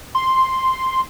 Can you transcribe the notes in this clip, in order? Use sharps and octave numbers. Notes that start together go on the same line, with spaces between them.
C6